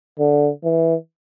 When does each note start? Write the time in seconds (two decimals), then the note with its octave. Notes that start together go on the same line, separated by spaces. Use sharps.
0.19 D3
0.64 E3